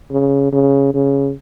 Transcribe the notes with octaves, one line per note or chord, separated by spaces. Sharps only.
C#3
C#3
C#3